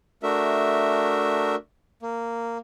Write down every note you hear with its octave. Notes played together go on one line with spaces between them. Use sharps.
A3 D4 F#4 A#4 E5
A#3